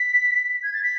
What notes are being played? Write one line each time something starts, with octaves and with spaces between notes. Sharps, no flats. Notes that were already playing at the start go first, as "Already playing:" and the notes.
Already playing: B6
G#6
A6
B6